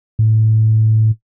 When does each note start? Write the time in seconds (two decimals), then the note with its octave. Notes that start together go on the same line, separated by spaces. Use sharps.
0.19 A2